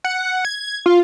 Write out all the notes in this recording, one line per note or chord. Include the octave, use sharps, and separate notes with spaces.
F#5
G#6
F4